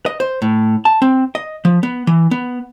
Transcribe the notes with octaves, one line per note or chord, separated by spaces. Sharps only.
D#5
C5
A2
A5
C4
D#5
F3
B3
E3
B3